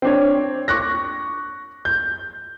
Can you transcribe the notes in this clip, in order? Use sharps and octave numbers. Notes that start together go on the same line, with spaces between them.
C4 D4 C#5
C#6 D6 F#6 A#6
G6